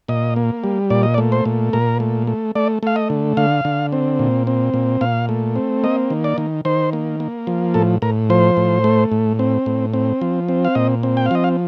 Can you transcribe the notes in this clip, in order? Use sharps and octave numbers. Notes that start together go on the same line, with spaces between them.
A#2 D#5
A#3
G3
A#2 D5
D#5
D5
A3
C5
A#2
A#2 A#4
A3
A3
A3 D5
A3 F5
D#5
D3
D3 F5
D3
C4
A#2
C4
A#2
A#2 F5
A3
C4
A#3 D#5
D#3
D5
D#3
D#3 C5
A#3
A#3
F3
A2 A4
A2 A#4
F3 C5
A2
A3
A2
C4
A2
C4
F3
C4
F5
A#2 D#5
C4
G5
F5
F3 D#5
F5